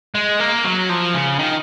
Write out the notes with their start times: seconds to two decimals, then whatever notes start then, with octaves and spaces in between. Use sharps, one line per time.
0.15 G#3
0.40 A#3
0.64 F#3
0.89 F3
1.14 C#3
1.39 D#3